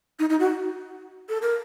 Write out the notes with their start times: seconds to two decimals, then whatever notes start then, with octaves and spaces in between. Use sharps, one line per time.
0.19 D#4
0.29 D#4
0.39 F#4
1.29 A4
1.42 A#4